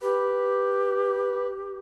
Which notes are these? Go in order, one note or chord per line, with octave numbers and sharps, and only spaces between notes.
G4 B4